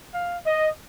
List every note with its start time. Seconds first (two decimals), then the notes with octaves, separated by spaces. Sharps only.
0.14 F5
0.45 D#5